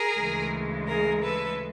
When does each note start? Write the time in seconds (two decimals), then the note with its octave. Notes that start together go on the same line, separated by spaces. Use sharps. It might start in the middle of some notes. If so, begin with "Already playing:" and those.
Already playing: G#4 A#4
0.15 D2 C#3 E3 G#3
0.87 G#4 A#4
1.23 A4 B4